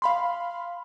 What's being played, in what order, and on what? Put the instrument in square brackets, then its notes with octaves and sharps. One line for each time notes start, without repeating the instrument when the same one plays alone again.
[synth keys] F5 B5 C6